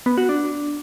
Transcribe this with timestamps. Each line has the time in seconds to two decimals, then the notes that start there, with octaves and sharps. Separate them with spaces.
0.06 B3
0.18 F#4
0.29 D4